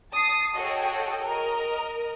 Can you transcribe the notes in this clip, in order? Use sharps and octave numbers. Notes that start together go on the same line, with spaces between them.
A5 D#6 C7
F#4 G#4 A4 C#5 D#5 G5
A#4 D#5 A#5